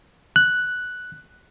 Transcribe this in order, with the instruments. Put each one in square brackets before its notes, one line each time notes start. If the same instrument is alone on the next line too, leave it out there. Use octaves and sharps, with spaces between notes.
[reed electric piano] F#6